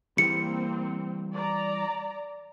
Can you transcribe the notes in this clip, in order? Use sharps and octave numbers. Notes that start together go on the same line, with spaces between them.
E3 G3 A#3 C4 C#7
D5 A#5